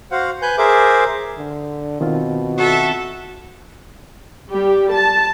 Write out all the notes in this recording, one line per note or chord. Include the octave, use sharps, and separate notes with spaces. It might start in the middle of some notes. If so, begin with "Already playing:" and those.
F#4 C5 F5 F#5
B4 G#5 F#6 G6
G#4 A#4 C5 E5 D6
D3
B2 D#3 C4 F4
F#4 A4 E5
G3 G4
A5